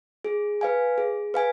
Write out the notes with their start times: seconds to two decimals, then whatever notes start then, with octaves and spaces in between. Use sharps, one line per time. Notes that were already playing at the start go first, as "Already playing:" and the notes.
0.24 G#4
0.61 B4 F5 G#5
0.98 G#4
1.34 B4 F5 G#5